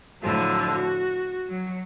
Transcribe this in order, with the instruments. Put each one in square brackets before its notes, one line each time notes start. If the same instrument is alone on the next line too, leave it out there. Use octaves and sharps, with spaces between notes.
[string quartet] A2 D3 F3 F#3
F#4
F#3